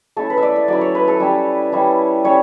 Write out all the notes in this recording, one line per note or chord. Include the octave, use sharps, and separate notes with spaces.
A3 C#4 E4 A4
B4
E5
D5
E5
F#3 C#4 E4 D5
C#5
B4
A4
G3 C#4 E4
G3 C#4 E4
G3 C#4 C#5